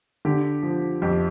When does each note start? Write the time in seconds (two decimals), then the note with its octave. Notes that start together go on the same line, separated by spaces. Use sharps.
0.25 D3 G4
0.63 F3
1.02 F2 G4